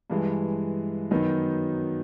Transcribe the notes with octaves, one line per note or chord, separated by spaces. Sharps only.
G2 E3 G#3
F#2 D#3 F#3 B3 D#4